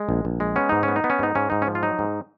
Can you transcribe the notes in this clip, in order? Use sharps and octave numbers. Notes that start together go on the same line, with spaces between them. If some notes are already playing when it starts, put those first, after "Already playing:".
Already playing: G#3
A#1
A#1
G#3
B3 C#4
G#2 D#4
C#4
B3
D#4
B3
C#4
G#2 D#4
G#2 C#4
G#2 D#4
C#4
F3
F4
F#3 D#4
G#2